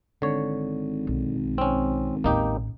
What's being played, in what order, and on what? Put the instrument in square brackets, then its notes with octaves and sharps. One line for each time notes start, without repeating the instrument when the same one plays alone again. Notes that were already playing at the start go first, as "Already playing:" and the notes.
[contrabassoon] G#1 [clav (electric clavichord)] D3 C#5
[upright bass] B1
[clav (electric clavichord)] C4 C#4
[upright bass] A1 D#2 [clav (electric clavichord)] A#3 D#4 G4